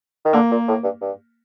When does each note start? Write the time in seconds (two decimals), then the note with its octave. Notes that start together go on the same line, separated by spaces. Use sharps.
0.25 D#3
0.33 D3 A#3
0.51 A#2
0.68 A2
0.84 G2
1.01 G2